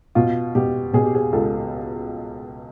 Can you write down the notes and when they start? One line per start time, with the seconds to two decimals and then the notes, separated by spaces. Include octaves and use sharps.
0.15 B2 F4
0.55 B2 G4
0.93 B2 G#4
1.04 G4
1.15 G#4
1.33 C#2 A4